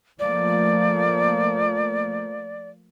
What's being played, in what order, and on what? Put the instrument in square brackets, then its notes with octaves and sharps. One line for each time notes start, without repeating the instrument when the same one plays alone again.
[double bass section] F3 A3 A#3 [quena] D5